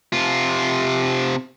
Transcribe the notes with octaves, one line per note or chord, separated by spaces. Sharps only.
C3 F4